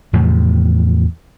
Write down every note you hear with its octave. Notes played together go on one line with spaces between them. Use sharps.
E2 A2 C3 F3